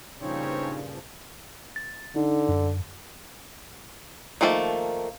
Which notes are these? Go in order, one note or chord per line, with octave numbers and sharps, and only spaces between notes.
G2 A#2 C#3 F3 C4 C#4 D#4 C#5
A6
D3 D#4
F#2
D#3 F3 A3 A#3